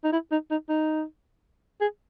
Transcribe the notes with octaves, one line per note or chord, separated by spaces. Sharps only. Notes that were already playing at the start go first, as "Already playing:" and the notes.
D#4
E4
D#4
D#4
D#4
G#4